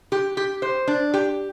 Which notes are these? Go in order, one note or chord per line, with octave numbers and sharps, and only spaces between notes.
G4
G4
C5
D4
G4